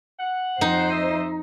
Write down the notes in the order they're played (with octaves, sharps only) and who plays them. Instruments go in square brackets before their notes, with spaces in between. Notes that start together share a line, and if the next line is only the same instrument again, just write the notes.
[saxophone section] F#5
[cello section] F2 C5 [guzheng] D#4
[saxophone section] D#5 E5